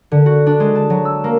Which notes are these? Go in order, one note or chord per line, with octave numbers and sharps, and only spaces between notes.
D3
F#4
D4
G#3
A5
F#3
E6
A#3